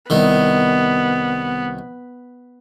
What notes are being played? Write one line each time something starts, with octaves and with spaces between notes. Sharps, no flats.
C2 D#3 B3